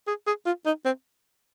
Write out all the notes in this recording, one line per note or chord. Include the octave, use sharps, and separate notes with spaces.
G#4
G#4
F4
D#4
C4